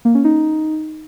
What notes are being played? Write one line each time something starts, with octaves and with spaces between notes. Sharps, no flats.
A#3
C#4
D#4